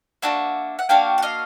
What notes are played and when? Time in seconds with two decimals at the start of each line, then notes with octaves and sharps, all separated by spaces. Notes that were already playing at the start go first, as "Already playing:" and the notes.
0.22 A#3 D4 F#4 E5 F#5
0.79 F#5
0.89 A#3 D4 F#4 F5 G5
1.18 F#5
1.22 D#5 F5